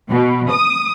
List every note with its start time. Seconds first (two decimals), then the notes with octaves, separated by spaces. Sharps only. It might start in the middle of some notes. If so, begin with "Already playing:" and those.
0.10 B2
0.51 D#6